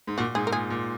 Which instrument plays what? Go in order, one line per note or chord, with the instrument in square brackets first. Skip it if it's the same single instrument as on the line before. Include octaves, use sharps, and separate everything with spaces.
[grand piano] G#2
[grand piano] A#2 [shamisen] F#4
[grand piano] G#2 [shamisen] G#4
[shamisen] A#4
[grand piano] A#2 [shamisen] G#4
[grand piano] A#2